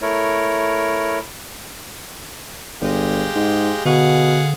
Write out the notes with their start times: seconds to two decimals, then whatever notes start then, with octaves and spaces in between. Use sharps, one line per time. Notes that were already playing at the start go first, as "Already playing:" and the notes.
0.02 A3 E4 A#4 C#5
2.81 G1 G#3 G4 F5
3.35 G#2
3.85 B2 D3 G#4 F5 F#5